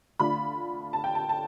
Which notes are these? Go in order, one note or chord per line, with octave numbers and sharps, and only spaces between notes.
D3 A3 D4 F4 B5
A5
G5
A5
A5